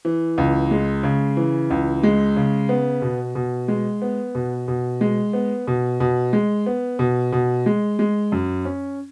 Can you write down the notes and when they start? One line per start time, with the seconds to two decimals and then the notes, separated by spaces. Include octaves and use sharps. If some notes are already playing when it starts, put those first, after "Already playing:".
0.05 E3
0.38 C#2
0.71 G#3
1.03 C#3
1.37 E3
1.70 C#2
2.03 G#3
2.36 C#3
2.69 B3
3.02 B2
3.35 B2
3.68 G#3
4.02 B3
4.35 B2
4.68 B2
5.01 G#3
5.33 B3
5.67 B2
6.00 B2
6.33 G#3
6.66 B3
6.99 B2
7.33 B2
7.66 G#3
7.99 G#3
8.32 F#2
8.65 C#4